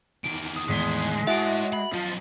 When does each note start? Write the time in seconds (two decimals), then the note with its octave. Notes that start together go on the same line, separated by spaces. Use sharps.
0.24 E2 D#3 D7
0.56 D#6
0.69 E2 A2 D#3 G#3 B6 G7
1.27 E4 F#4 C#5 E5 D7
1.73 B5
1.93 F#2 F3 D#5